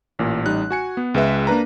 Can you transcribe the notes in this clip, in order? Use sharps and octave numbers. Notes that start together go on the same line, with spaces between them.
A1 A#2
A1 G3 D#4 F#6
F#4 G#5 C#7
B3
C#2 G#3 B4 E5
A#3 D4 B4 A#5